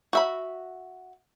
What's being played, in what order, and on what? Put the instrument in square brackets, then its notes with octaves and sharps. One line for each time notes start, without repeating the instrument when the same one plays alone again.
[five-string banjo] F#4 E5 B5